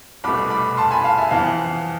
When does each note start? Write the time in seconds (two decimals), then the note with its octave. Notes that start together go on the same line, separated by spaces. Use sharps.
0.24 C2 B2 A3 B5 D6
0.50 B5 D6
0.77 A5 C6
0.91 G#5 B5
1.04 F5 A5
1.18 E5 G#5
1.31 F2 E3 B3 F5 A5